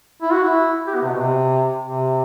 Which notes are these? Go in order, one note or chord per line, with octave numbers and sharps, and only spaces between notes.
E4
F#4
E4
G4
B3
C3
B2
C3
C3